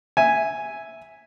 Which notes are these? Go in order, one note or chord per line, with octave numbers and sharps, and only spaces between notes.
E5 G#5